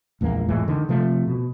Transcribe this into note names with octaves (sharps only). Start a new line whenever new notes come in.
A#1 E2 G#3 A#3
F2 A2 E3 G#3
D3 D#3
C3 F3 A3
B2